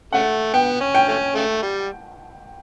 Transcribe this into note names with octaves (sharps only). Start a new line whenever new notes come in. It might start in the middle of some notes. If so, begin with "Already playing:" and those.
C#3 A3 F#5
B3 G5
C#4
G5
A3 C#4
C#3 A3
G3